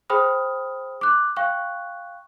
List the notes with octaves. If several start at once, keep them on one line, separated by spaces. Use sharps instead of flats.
G#4 C5 G5 B5 D#6 F6
D6 F#6
F5 G5 C#6 F#6